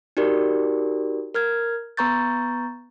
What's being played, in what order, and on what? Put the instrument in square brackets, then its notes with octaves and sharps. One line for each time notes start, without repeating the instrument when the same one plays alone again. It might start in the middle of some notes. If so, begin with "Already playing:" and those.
[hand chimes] D#4 F#4 G4 A#4 D5
A#4 F6 G#6
B3 B4 A#5 C#6 G6 A6